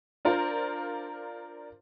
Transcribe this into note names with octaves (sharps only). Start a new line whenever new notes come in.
D4 F4 A#4 C5